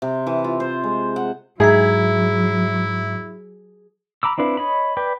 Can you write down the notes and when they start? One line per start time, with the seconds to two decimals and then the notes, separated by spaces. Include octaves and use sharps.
0.02 C3
0.27 E3
0.44 F4
0.60 C5
0.84 G#3
1.16 F#5
1.60 G#2 F#3 E4 G#4 E5 A#5
4.23 A#5 B5 D6 E6
4.38 C4 D4 E4 B4 F5
4.57 C#5 D#5 B5
4.97 B4 D5 G5